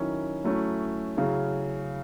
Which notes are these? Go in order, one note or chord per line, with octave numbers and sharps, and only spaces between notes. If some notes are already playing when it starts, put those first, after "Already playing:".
Already playing: D#3 F#3 C#4 E4
F#3 A3 C#4 E4
C#3 F#3 C#4 E4